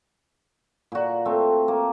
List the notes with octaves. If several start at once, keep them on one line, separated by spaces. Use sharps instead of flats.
A#2 F#4
A3 C4
A#3